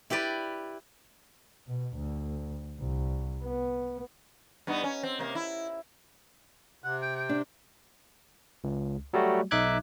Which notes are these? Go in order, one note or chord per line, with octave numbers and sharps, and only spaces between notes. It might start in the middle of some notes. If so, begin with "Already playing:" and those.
E4 G4 B4 D5
B2
D2
C2
B3
G2 B3 D#4
C#4
C4
C3 A#3
E4
C3 F#5
G5
G5
D4
C#2
F#3 G3 A3 F#4
B1 D#4 E5 D6 F#6 G#6